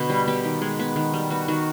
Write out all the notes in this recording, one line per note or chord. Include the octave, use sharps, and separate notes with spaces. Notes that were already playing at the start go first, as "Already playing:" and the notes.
Already playing: B2 D3 B3
G3
B3 G4
D#3
G#3
B3
D#3
G3
B3 F#4
D#3 F#4